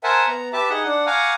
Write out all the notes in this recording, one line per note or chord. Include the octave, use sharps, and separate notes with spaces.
A#4 C5 E5 F#5 G#5 A5
B3 A#5
G4 B4 E5 A5 D6
D#4 G#4 D#5 F#5
D4 F#5
F5 F#5 G#5 A#5 C#6 D6